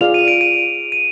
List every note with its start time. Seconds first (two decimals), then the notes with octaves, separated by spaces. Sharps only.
0.01 F4 G#4 D5 F5 F7
0.14 D#7
0.28 D7
0.41 D#7
0.92 D#7